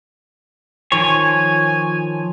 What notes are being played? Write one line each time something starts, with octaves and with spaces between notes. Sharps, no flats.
D#3 F3 C#5 G#5